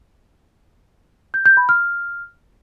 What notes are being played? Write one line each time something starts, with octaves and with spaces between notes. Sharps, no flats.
G6
G6
B5
F6